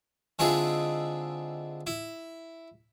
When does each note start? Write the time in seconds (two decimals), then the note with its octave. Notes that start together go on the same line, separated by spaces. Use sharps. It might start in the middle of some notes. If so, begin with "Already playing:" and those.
0.39 D3 G#3 C4 E4 F4 G#4
1.87 E4